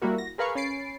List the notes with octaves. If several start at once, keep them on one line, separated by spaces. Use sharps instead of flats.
G3 A#3 E4 F#4 A#4
A#6
G#4 A#4 B4 F5 B5 C#6
C#4 B5 A6 C7 D7